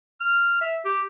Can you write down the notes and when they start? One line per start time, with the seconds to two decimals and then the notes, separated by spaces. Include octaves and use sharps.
0.21 F6
0.61 E5
0.85 G4